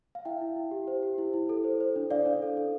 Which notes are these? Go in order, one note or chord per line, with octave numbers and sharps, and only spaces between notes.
F5
E4 E5 G5
E4
E4
G4
C5
G4
E4
E4
A4
C5
C5
D4
D4 D5 F5
D4
A4
D4